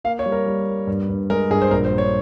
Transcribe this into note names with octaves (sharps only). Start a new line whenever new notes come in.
A#3 F5
C#5
G3
A#4
G3
A#3
G2
G2
G#3 A#4
G2 G#4
C5
A#1 A#4
C5
A#3
C#5